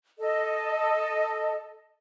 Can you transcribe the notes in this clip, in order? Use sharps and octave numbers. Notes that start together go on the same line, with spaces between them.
A4 D#5